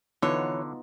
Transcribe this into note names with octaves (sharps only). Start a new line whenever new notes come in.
D3 E3 B3 D#4 F4 C#5